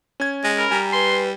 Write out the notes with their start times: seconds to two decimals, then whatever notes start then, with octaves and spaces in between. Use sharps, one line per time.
0.20 C#4 G#6
0.44 G#3
0.58 A#4 B5
0.71 G3 G#5 A#5
0.93 B4 C6